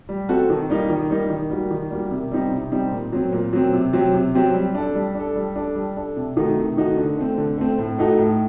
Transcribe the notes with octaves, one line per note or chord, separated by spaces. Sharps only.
G3
C4 F#4 A4
D#3
G3 A#3 D#4
D#3
G3 A#3 D#4
D#3
G3 A#3 F#4
D#3
G3 A#3 F#4
C3
G3 C4 D#4
C3
G3 C4 D#4
A#2
F#3 C4
A#2
F#3 C4
C3
F#3 C4 G4
C3
F#3 C4 G4
G3
D4 A4
G3
D4 A4
G3
D4 A4
G3
D4 A4
C3
D#3 A3 D#4 F#4
C3
D#3 A3 D#4 F#4
D3
A3 C4
D3
A3 C4
A2
A3 D#4 F#4 A4
A2